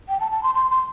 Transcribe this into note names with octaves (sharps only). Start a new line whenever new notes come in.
G5
A5
A5
C6
C6
C6